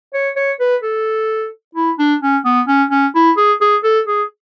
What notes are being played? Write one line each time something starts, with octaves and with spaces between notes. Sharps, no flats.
C#5
C#5
B4
A4
E4
D4
C#4
B3
C#4
C#4
E4
G#4
G#4
A4
G#4